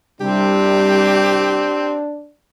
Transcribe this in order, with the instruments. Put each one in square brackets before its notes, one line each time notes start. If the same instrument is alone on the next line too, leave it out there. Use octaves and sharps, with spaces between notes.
[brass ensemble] C2 C3 G3 [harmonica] C4 [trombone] D4 [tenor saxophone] G4